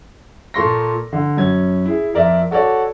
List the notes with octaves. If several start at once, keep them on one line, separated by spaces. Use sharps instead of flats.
A#2 A4 A#4 C6 C#6 A#6
D3
F#2 C#4 G#6
E4 G#4
F2 A#4 D5 E5
F#4 A4 C#5 D5